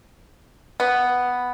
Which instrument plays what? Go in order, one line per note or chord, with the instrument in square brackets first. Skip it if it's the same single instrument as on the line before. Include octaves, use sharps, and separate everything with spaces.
[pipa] B3